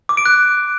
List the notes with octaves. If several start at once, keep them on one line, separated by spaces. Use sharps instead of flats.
D6
D7
F#6